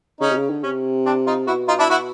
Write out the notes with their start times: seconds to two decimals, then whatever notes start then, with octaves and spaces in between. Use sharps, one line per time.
0.21 C#3 C#4 D#4
0.31 C3
0.36 C#3
0.50 D3
0.63 C3 C#4
1.05 C4 D4
1.27 D#4 F4
1.47 B2 E4 F#4
1.68 D#4 F4
1.79 D4 E4
1.90 E4 F#4